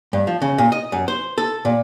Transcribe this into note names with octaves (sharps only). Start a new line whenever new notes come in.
G2
F3
C#3
A#2
D#5
F#2
C5
A4
A#2